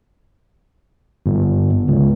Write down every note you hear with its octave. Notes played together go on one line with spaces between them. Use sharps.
G1
C#2